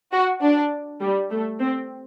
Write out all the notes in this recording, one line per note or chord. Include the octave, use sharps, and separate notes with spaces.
F#4
D4
G3
A3
C4